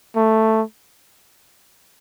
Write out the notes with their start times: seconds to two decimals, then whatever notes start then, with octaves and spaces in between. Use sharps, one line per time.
0.16 A3